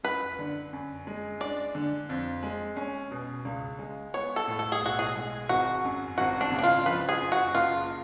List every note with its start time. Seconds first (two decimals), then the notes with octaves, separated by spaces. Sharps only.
0.03 F#2 B4
0.39 D3
0.73 F#2
1.07 G#3
1.40 D4 D5
1.75 D3
2.09 F2
2.43 G#3
2.77 C#4
3.11 B2
3.45 C#2
3.79 G#3
4.14 B3 C#5
4.36 A4
4.48 A2
4.59 A4
4.72 G#4
4.82 B1 F#4
4.99 G#4
5.15 G#3
5.49 G#1 F#4
5.85 F#2
6.18 G#1 F#4
6.41 D4
6.52 C#3
6.59 D4
6.63 F4
6.86 F3 B4
7.09 G#4
7.21 F#2
7.32 F#4
7.55 F#1 F4